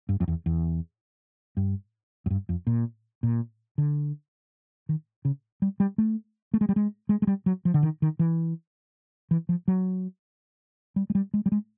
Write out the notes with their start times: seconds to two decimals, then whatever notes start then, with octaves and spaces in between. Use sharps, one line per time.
0.09 G2
0.20 F2
0.28 E2
0.46 E2
1.57 G2
2.26 F#2
2.30 G2
2.49 F2
2.67 A#2
3.23 A#2
3.78 D3
4.89 D#3
5.25 C#3
5.62 G3
5.80 G3
5.98 A3
6.54 A3
6.61 G#3
6.69 G3
6.76 G#3
7.09 G#3
7.22 G#3
7.27 G3
7.46 F#3
7.65 F3
7.74 D3
7.83 D#3
8.02 D#3
8.19 E3
9.31 E3
9.49 F3
9.68 F#3
10.96 G3
11.10 G#3
11.15 G3
11.34 G#3
11.46 G3
11.52 G#3